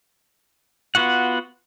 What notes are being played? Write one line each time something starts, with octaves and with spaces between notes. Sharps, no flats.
B3 F4 F#4 F#5